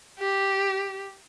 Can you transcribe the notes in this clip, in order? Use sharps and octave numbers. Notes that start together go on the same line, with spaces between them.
G4